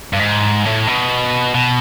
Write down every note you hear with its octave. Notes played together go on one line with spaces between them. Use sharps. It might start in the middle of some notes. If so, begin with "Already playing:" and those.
G2
G#2
A2
B2
B2